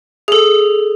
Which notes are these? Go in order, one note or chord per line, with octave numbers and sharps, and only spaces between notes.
G#4
A4